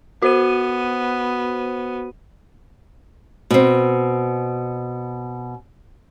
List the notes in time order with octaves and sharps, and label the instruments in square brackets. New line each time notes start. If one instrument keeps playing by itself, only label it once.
[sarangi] B3 [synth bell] F#4 C5 D#7
[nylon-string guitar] B2 C4